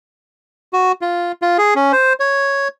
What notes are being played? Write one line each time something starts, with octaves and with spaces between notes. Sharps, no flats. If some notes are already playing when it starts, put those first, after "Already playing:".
F#4
F4
F4
G#4
C#4
C5
C#5